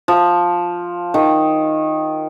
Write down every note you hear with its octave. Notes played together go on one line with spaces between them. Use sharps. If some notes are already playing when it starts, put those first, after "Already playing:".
F3
D#3